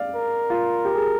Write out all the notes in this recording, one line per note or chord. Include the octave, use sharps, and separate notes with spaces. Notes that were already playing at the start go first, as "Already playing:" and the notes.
Already playing: D5 F5
A#4
F4
G4
G#4